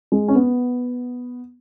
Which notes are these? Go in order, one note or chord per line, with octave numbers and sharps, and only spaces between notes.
G#3
C#4
B3